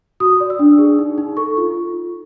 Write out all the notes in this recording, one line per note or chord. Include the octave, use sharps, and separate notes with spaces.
F#4 D#6
D5
E6
D4
G#4
D#4
D#4
A4 C#6
F4